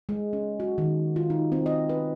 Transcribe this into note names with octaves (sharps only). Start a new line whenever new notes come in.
G#3
C#4
F#4
D#3
F4
D#4
C4
D#5
B4